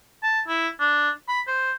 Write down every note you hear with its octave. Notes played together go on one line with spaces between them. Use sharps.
A5
E4
D4
B5
C5